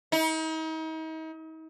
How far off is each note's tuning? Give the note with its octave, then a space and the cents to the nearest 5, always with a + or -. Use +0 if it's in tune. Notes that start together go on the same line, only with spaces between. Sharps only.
D#4 +40